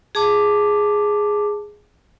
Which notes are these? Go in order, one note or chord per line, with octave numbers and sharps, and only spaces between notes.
G#4 A5 D6